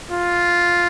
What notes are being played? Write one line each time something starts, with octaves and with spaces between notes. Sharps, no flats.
F4